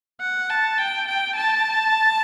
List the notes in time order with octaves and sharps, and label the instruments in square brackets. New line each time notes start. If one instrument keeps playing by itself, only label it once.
[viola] F#5
A5
G5
G5
A5